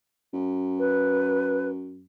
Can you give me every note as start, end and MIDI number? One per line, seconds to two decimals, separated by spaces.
0.33 2.06 42
0.79 1.67 71